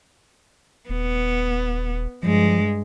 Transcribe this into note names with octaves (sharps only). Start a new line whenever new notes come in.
D#1 B3
G2 F3 G#3